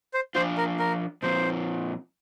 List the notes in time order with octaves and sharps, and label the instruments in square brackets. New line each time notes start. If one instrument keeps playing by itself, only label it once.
[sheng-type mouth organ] C5
[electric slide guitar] F3 D4 F4 [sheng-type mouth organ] C5
[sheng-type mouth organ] A#4
A#4
[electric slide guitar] A#2 F3 C4 F4 [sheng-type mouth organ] C5